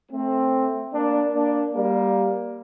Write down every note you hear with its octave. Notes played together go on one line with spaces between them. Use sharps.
A3 C4
A#3 D4
A#3 D4
G3 A#3